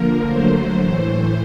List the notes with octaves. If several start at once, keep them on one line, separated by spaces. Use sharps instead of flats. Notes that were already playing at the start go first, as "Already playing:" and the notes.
Already playing: D3 F3 A#3 A#4
D3 F#3 A3 C5
A2 E3 A3